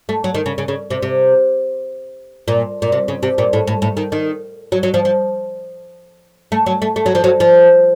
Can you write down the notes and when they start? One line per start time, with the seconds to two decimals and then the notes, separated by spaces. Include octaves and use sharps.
0.09 A3
0.24 F#3
0.34 D#3
0.46 C#3
0.58 C#3
0.68 C#3
0.90 C3
1.02 C3
2.48 A#2
2.82 A#2
2.92 C3
3.08 C#3
3.23 C3
3.38 A#2
3.53 A2
3.67 A2
3.82 A2
3.97 D#3
4.12 D#3
4.72 F#3
4.83 F#3
4.94 F3
5.05 F3
6.52 A3
6.66 F#3
6.82 A3
6.96 A3
7.06 F#3
7.15 F3
7.24 F#3
7.40 F3